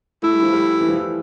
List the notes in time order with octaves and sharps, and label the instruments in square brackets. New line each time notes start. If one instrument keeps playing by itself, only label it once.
[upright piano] A3 [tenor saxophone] E4
[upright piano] G3
F3
G3
E3
F3
E3